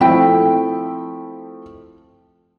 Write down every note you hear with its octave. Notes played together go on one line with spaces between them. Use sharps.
F3 A3 C4 E4 G5